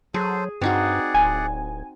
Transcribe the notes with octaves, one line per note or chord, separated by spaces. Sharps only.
F#3 G#4 A4 C5
G2 C4 D#4 F#4 G#4 D5 F#5
D1 G#5